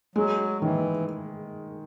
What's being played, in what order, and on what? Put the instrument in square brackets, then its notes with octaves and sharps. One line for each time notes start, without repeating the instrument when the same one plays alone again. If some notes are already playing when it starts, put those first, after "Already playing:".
[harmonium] F#3 [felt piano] G#3
[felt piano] D#3 [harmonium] E3